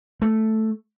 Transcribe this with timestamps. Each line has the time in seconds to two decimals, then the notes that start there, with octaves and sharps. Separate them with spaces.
0.22 A3